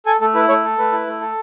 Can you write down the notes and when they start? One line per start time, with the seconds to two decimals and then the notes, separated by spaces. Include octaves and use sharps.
0.06 A4 G#5
0.20 A3 A4
0.34 E4 B4
0.48 A3 C#5
0.64 A4
0.78 A3 B4
0.92 E4
1.07 A3
1.20 A4